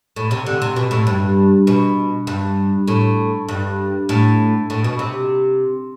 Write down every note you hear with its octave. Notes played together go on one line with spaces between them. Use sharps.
A2
C3
D3
C3
B2
A2
G2
B2
G2
A2
G2
A2
A2
B2
C3